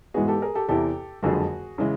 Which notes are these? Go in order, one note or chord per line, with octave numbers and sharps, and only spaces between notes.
G#2 E3 G#3 B3 F#4 G#4
G4 A4
G#4 A#4
G4 A4
E2 C3 E3 G4 A4
F#1 F2 D3 F3 G#3 F#4 G#4
C#3 E3 G#3